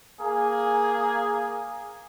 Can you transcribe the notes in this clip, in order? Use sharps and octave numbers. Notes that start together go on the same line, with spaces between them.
A#3 G#4 G#5